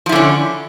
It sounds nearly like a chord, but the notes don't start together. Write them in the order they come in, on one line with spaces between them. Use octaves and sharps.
F3 E4 D3 C#4